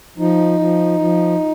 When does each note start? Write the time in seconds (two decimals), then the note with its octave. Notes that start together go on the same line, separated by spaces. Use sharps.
0.18 F3 D#4
0.59 F3
0.99 F3